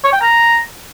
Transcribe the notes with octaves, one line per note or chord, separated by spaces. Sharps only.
C#5
G5
A#5